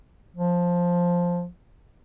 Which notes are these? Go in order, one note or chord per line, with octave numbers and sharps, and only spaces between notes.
F3